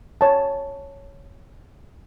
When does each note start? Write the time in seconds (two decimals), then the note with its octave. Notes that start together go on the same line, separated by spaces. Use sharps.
0.21 C#5 A5